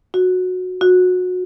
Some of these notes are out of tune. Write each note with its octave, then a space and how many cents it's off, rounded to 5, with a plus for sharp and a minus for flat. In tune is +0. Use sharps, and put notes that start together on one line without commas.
F#4 -15
F#4 -25